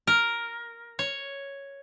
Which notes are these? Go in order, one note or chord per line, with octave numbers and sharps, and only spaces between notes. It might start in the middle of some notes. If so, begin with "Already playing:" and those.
A#4
C#5